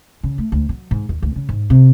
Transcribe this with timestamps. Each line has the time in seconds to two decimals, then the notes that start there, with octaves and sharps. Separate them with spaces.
0.23 C#3
0.38 A3
0.52 D2
0.69 F#3
0.91 G#2
1.09 D#2
1.22 D2
1.36 C#3
1.49 G#2
1.70 C3